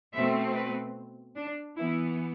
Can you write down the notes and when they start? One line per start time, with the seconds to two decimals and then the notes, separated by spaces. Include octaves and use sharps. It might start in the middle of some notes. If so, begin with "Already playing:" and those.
0.13 B2 A3 C4 E5
0.55 B4
1.36 D4
1.76 E3 B3 E4